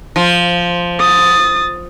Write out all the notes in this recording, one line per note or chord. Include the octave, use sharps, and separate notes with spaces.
F3
D#6 A6